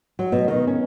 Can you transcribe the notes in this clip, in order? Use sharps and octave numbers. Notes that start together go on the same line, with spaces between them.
F#3
B2
D#3
C#4